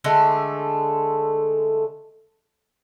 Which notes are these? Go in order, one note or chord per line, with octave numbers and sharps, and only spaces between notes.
D3 G#3 A3